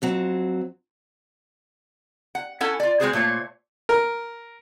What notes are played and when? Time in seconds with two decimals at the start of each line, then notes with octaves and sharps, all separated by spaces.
0.02 F2 F#3 C4
2.35 F#5
2.61 C#4 E4 A4 F#5 G#5
2.80 F4 D5
3.00 G#3 C4 F4 F#4 G#4 C5
3.13 A#2 A3 C5 C#5
3.89 A#4